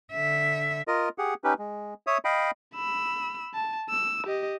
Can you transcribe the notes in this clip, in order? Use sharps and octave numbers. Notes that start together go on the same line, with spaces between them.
D3 E5
F4 A#4 D#5
G4 G#4 F#5
C#4 D#4 G4 B4
G#3
C#5 E5 D#6
D#5 F5 G5 B5
B5 E6
A5
E6
G4 D#5